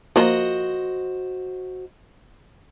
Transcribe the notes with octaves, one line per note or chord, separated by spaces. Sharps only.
F3 A#3 F4 F#4 C5 D#5